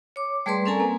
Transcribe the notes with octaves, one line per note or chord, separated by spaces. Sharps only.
C#5 D6
G3 A3 G#4 B4 D5 C6
C4 C#4 A4 A#4 G#5 A#5
A#3